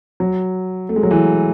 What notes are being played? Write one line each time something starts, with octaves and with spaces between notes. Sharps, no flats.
F#3
A3
G#3
F#3
E3